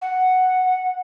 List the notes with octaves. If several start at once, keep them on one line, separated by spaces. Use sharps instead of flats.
F#5